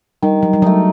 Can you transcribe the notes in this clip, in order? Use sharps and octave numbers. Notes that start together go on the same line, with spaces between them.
D#3 G3
F#3
G3
F#3 A3 D#4